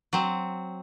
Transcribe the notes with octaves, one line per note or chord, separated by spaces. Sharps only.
F#3 C4